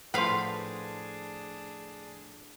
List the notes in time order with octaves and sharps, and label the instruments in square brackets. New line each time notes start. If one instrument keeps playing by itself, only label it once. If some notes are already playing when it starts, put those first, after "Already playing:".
[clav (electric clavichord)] A2 F3 [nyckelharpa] D4 G#4 [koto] B4 F5 [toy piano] F#5 C6